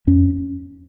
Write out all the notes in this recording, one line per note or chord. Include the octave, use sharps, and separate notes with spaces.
F2 C#4